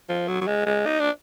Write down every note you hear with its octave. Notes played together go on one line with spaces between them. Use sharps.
F3
F#3
F#3
G#3
G#3
D#4
D4